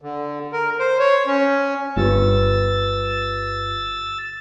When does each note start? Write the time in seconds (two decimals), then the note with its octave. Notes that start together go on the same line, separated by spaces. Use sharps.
0.02 D3
0.53 A#4
0.79 C5
0.99 C#5
1.27 C#4
1.97 G1 F4 G4 B4 E6 A6